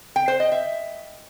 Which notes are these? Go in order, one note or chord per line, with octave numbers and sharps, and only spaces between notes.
G5
C5
D#5
E5